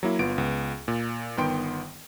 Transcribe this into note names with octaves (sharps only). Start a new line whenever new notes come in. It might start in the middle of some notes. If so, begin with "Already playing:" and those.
F#3 A#3 E4
G1 B3 F4 D7
C#2 B3
A#2
G1 D#3 B3 G5 C6 D7